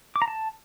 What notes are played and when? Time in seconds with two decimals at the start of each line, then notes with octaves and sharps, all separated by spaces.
0.16 D6
0.22 A#5
0.28 A5